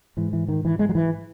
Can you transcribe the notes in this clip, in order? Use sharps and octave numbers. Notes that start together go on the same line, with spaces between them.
G#2 E3
E3
D#3
E3
G#3
F#3
E3